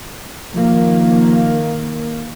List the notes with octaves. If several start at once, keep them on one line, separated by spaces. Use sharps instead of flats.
D#3 F3 A#3